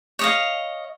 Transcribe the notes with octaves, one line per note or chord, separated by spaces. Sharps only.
C#5 D#5 F5